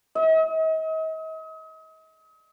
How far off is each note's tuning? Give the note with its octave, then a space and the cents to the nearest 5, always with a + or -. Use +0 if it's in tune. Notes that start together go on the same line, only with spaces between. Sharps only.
D#5 +40